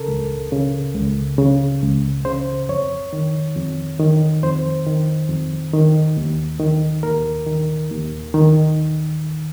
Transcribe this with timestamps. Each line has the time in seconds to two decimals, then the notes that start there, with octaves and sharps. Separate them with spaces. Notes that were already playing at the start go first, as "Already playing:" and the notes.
Already playing: C#3 A4 A#4
0.08 C#2
0.52 C#3
0.95 C#2
1.38 C#3
1.82 C#2
2.25 C#3 C5
2.69 F2 C#5
3.13 D#3
3.56 F2
4.00 D#3
4.43 F2 C5
4.86 D#3
5.29 F2
5.73 D#3
6.17 D#2
6.60 D#3
7.03 D#2 A#4
7.47 D#3
7.91 D#2
8.34 D#3